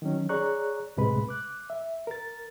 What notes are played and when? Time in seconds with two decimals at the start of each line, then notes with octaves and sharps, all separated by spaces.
0.02 D#3 F#3 C#4
0.29 G#4 C#5 D5 A#5 C#6 F#6
0.97 C#2 A2 C3 G#3 B4 B5
1.29 D6 F#6
1.70 E5
2.07 A#4 A6